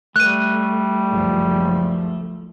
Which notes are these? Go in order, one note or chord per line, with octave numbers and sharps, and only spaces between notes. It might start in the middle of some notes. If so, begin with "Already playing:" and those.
G3 A3 F#6 D#7
F#1 C#2 F3